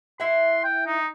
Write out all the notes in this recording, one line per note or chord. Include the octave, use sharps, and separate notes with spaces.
E4 E5 F#5 C6
G5
D#4